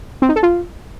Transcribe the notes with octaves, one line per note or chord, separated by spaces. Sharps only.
C4
D#4
A4
F4